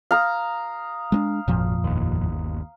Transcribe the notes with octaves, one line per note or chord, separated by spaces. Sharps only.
F5 A#5 D#6
G#3 B3 D4
G#1 F2 A#2 F3
G1 D#2